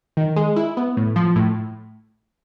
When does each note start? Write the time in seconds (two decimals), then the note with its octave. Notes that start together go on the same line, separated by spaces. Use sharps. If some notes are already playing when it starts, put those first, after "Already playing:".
0.17 D#3
0.36 G#3
0.56 E4
0.77 B3
0.97 A2
1.16 F3
1.36 A2